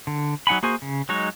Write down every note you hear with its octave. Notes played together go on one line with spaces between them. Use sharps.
D3
F#3 D#4 F#5 G#5 B5
A#3 F#4 G#4 C5 G#5
C#3
F#3 G#3 D#4 C#5